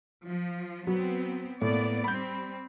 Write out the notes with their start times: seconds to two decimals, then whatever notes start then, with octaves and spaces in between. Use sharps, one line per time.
0.25 F3
0.87 F#3 B3 C4
1.62 A2 A#3 B3 D5
2.04 G3 C4 B5 G6